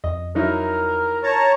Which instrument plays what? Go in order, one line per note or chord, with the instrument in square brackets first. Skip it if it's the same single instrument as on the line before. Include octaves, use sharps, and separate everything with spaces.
[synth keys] F2 [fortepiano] D#5
[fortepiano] F#3 D#4 E4 [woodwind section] A#4
[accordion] C#5 A5 A#5